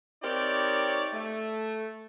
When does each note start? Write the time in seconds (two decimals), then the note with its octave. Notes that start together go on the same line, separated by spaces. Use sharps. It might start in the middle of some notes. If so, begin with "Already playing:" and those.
0.23 C4 D#4 G4 A#4 C#5 D5
1.13 A3